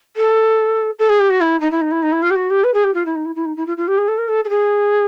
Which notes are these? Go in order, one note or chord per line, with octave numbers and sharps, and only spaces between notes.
A4
A4
G#4
G4
F#4
E4
D#4
E4
D#4
E4
D#4
E4
F4
G4
F#4
G4
B4
G#4
G4
F4
E4
D#4
E4
E4
D#4
E4
F4
F4
G4
G#4
A4
A#4
A4
A4
G#4